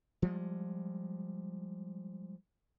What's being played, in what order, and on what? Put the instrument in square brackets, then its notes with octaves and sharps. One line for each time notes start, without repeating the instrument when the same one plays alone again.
[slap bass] F3 G3 G#3